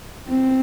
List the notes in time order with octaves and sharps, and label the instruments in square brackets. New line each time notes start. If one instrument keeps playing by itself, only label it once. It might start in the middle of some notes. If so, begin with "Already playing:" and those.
[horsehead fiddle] C4